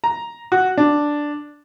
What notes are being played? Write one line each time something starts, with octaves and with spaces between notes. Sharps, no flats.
A#5
F#4
D4